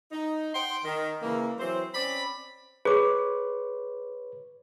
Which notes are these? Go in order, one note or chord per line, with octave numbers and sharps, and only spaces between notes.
D#4
F#5 G5 C6
D#3
C#3 E3 G#3 A#3
E3 F#3 C4 C5
C4 C#4 D5 B5
G#4 B4 C#5 D6